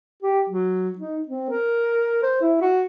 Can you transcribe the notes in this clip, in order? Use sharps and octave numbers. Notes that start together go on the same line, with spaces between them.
G4
F#3
D#4
C4
A#4
C5
E4
F#4